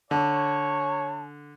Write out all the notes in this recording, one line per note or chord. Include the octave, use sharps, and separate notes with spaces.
D3 C#5 A5